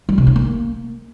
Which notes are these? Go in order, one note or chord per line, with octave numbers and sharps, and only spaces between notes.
G3
C3
C#4
A#3